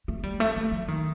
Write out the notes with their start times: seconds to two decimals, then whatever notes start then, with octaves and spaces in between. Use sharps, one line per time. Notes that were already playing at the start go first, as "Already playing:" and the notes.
0.08 A3
0.23 G3
0.40 A3
0.56 A3
0.72 F#3
0.88 D#3